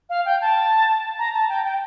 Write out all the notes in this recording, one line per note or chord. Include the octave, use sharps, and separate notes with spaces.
F5
G5
A5
A#5
A5
G5
G5